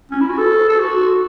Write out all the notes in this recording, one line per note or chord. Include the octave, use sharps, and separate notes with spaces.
C#4
E4
F#4
A4
A4
F#4